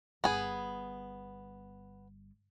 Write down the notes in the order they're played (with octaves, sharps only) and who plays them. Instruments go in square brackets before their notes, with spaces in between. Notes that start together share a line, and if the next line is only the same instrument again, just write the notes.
[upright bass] G1 [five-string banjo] B3 G#4